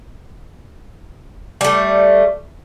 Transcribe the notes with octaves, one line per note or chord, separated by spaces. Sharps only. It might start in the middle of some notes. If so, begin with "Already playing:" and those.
G3 A3